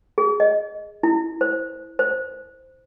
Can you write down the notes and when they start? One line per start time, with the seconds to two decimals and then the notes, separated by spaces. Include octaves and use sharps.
0.18 G#4
0.40 D#5
1.03 E4
1.41 C5
1.99 C5